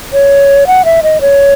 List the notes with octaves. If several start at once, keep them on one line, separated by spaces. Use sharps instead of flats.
C#5
F#5
E5
D#5
C#5